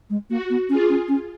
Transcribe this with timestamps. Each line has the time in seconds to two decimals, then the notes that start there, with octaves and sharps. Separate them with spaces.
0.10 G#3
0.29 A#3 F#4
0.50 B3
0.69 C#4 F4 G#4
0.89 C#4
1.08 C#4